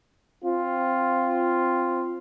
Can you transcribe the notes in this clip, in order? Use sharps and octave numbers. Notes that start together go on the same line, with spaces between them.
C4 F4